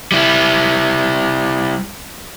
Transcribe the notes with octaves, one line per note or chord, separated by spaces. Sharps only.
G3 E4